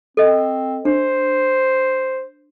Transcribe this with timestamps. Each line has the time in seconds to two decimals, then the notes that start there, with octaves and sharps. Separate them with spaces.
0.17 C4 A4 D#5
0.85 D4 C5